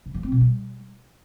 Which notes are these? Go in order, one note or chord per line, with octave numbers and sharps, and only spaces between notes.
C#3
F3
C4
B2
G3